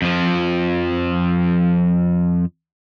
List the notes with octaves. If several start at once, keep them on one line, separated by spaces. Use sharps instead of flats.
F2 F3